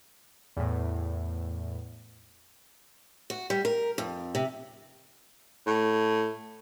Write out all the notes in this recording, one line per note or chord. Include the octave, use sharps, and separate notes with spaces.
E2 A2
F#4
G3
A#4
F2
C3
A2